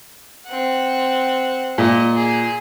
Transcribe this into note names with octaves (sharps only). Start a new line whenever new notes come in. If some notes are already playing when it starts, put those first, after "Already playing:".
C4 F#5
A#2 D#5
G#4